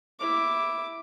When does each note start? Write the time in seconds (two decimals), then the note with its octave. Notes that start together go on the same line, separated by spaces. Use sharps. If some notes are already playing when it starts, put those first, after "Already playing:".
0.19 E4 D6